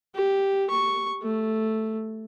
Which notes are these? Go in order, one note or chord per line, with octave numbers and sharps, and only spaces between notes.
G4
C#6
A3